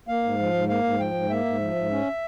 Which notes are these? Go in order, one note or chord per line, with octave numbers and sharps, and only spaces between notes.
A#3 F5
G#2
F3
G#2
A#3 F5
G#2
F3 G5
G#2
A#3 E5
G#2
F3
G#2
C#4